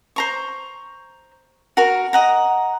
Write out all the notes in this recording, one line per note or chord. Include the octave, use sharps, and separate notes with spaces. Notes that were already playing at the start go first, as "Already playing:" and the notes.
C5 A#5 C#6
F#4 A#4
D#5 F#5 A#5